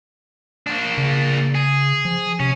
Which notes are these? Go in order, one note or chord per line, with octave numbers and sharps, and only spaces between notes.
A#3 D4
C#3
G#4
F3
C3 C#4